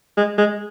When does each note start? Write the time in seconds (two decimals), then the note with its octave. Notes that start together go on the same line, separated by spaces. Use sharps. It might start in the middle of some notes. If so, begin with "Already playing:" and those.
0.17 G#3
0.38 G#3